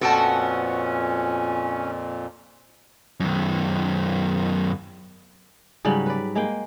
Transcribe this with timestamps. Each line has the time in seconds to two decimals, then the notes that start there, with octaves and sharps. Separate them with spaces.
0.01 F2 A#2 B3 C#4 F#4 A4 G5 A5
3.20 F#2 D#3
5.85 G#2 C#3 F#3 G3
6.06 B4 D5
6.35 G#3 A#3 G5